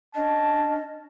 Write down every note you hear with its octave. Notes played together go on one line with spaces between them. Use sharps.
C#4 D4 D#5 A5